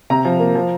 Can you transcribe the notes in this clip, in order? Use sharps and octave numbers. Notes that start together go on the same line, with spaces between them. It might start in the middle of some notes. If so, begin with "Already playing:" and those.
C3 A#5
F3
A#3
F3